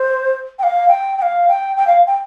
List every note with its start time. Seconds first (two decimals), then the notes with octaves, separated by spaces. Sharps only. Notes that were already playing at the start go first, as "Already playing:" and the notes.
Already playing: C5
0.59 G5
0.63 F5
0.88 G5
1.18 G5
1.22 F5
1.48 G5
1.77 G5
1.87 F5
2.07 G5